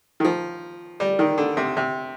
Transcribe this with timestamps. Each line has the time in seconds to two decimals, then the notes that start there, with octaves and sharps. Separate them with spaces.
0.20 D#3
0.24 F3
1.00 G3
1.19 D#3
1.38 D3
1.57 C3
1.77 C3